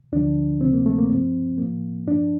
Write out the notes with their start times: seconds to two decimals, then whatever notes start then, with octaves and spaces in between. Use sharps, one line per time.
0.12 D2 D3 F3 D4
0.61 D2 C3 F3 C4
0.73 A#3
0.86 A3
0.98 A#3
1.10 G2 F3 C4
1.58 A2 F3 A#3
2.07 G2 F3 D4